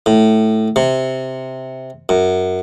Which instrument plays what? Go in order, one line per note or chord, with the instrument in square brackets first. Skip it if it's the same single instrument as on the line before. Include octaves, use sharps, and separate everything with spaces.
[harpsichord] A2
C3
F#2